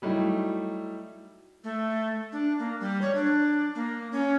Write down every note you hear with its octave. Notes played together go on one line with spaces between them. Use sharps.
F#3 G3 A3 D#4 E4
A3
D4
A#3
G3
C#5
D4
A#3
C#4